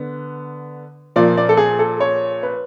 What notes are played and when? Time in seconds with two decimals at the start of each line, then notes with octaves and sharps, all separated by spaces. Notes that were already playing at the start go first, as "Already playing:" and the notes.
Already playing: D3 B3
1.16 A#2 F3 A#3 D5
1.37 D5
1.49 A4
1.57 G#4
1.79 A4
2.00 C#5
2.43 B4